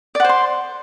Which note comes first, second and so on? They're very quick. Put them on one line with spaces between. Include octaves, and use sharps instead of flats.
D5 F#5 C5 C6